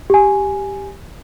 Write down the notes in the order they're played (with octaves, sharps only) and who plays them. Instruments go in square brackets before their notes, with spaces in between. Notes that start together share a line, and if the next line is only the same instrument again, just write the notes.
[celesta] G4 G#5